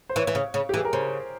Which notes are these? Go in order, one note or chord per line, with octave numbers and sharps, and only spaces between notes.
C5
E3 C#5
E3
C#3
C#3
G4
E3
G#4
A#4
C#3 C5